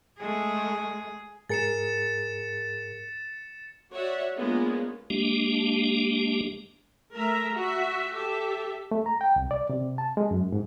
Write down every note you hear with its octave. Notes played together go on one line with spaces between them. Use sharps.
G#3 A3 G#4
G#2 G#4 A#4 A6 C#7 E7
F#4 C#5 D5 E5 F#5
G#3 A#3 B3 C#4 D4 F4
G#3 A#3 D4 G4
A3 A#4 E5 A#5
F#4 E5
G4 A4 E5
A3
A#5
G5
C2
D5
C3
A5
G#3
F#2
G#2